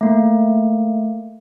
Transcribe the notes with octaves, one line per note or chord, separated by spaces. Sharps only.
A3 A#3